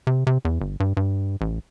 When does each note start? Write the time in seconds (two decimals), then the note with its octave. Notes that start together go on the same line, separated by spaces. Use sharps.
0.07 C3
0.27 C3
0.45 E2
0.61 G1
0.80 G2
0.97 G2
1.41 A1